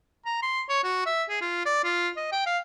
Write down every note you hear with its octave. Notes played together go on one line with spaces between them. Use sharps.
A#5
C6
C#5
F#4
E5
G#4
F4
D5
F4
D#5
G5
F5